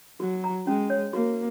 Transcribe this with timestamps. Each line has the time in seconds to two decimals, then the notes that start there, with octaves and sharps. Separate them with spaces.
0.20 F#3 F#4
0.44 A#5
0.67 G#3 C#4
0.90 C#5
1.13 A#3 F#4